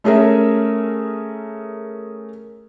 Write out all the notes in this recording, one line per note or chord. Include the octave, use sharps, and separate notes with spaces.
A3 C#4 G#4 A#4 E5